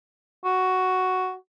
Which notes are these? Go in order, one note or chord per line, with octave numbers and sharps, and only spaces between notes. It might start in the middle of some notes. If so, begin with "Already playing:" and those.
F#4